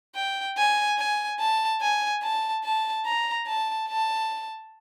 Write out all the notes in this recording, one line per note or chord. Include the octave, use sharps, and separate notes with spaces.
G5
G#5
G#5
A5
G#5
A5
A5
A#5
A5
A5